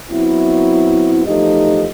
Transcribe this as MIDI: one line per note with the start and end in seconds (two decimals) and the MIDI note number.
0.11 1.25 54
0.11 1.25 59
0.11 1.25 60
0.11 1.25 64
1.26 1.86 40
1.26 1.86 53
1.26 1.86 57
1.26 1.86 63
1.26 1.86 67
1.26 1.86 75